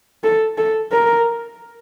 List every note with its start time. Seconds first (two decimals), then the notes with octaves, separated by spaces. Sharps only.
0.24 A4
0.58 A4
0.92 A#4